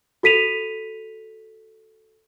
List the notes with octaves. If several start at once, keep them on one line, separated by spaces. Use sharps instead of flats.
F#4 A4 B6 D#7 F7